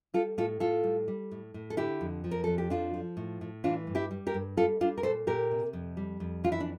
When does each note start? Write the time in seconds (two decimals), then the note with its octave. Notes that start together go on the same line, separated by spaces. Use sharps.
0.14 G3 F4 A4
0.38 A2 F4 A4
0.60 A2 F4 A4
0.84 G3
1.08 G3
1.31 A2
1.54 A2
1.70 A4
1.77 D3 E4 G4
2.01 F2
2.24 F3
2.31 A#4
2.44 F2 A4
2.58 G4
2.70 F3 D4 F4
2.94 F3
3.17 A2
3.41 A2
3.64 E3 D4 F4
3.87 G2
3.95 E4 G4
4.11 G3
4.27 G4 A#4
4.34 G2
4.57 G3 F4 A4
4.80 G3 D4 F4
4.98 A#4
5.03 A#2 A4 C5
5.27 A#2 G4 A#4
5.51 C3
5.73 F2
5.97 G3
6.20 F2
6.44 E3 F4
6.52 E4
6.60 D4